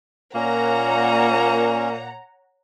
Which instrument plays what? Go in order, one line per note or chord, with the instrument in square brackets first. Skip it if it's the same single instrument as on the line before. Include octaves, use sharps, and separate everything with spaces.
[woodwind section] A#2 [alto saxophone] A#3 [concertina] C#4 [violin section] C#5 F#5 A#5